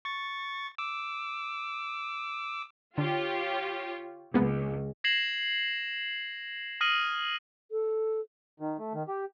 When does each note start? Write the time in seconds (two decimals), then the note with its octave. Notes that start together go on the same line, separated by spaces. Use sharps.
0.05 C#6 A6
0.78 D6 E6
2.98 D3 F4 G4 C#5
4.34 C#2 G#3 A#3 B3
5.04 G#6 A#6 C7 E7 F#7
6.81 D#6 F6 A#6 C7 D#7 F#7
7.71 A4
8.60 D#3
8.79 A3
8.94 D#3
9.08 G4